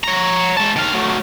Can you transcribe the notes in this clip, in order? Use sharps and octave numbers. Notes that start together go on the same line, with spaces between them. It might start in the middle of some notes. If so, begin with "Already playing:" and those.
C#5 A#5
G#3 A5
D#3 F5
F#3 A3